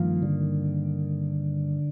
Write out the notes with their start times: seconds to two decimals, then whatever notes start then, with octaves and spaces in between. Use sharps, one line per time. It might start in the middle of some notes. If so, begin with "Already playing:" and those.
Already playing: G2 D#3 F3 A#3
0.23 D3